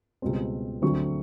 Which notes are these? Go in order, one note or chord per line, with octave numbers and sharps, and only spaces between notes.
C#2 B2 G3 C4
D2 D3 F#3 A3 C4 C#6